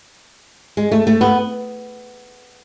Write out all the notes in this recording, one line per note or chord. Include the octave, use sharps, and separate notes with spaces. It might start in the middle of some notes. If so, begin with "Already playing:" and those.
G#3
A3
A3
B3